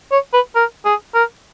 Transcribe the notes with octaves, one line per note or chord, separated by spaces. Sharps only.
C#5
B4
A#4
G#4
A#4